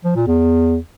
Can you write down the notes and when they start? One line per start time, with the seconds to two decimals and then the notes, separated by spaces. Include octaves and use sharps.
0.05 F3
0.16 A#2
0.27 E2